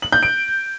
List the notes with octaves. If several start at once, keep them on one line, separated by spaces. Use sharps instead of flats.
F#7
G6
D7